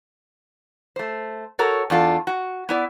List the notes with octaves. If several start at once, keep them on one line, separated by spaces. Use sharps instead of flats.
A3 C5
F#4 A4 A#4 C#5
E2 D4 F4 A4
F#4
B3 E4 D5